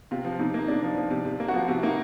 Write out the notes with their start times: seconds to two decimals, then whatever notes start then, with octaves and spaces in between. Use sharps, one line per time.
0.11 C3 F4
0.25 F3
0.39 C3 D#4
0.54 A#3
0.68 C3 D4
0.83 F3
0.96 F3
1.10 C3
1.25 C3
1.40 A#3
1.48 F#4
1.54 F3 F4
1.68 C3
1.76 E4
1.83 A#3 D#4